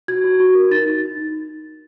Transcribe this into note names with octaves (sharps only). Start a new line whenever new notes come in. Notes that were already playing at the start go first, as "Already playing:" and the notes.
F#4 G#6
F#4
F#4
A#4
D#4 A6
D#4
D#4
D#4